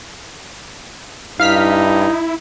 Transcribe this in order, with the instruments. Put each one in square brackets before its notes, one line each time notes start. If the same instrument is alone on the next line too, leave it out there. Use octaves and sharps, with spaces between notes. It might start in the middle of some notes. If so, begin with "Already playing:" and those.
[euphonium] G2 [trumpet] D#4 [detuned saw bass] E4 [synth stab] F5 F6 B6